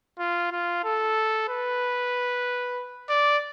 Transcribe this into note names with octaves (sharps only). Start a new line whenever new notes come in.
F4
F4
A4
B4
D5